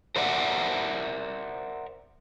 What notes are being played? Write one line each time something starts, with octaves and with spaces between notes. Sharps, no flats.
A#4 C5 D5 E5 F#5